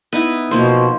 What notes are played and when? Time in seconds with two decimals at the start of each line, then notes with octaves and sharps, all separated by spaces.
0.13 B3 D#4 E4
0.51 B2 F3 A#3 C5